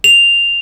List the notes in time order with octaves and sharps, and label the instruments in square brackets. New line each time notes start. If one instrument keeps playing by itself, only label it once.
[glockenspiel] F7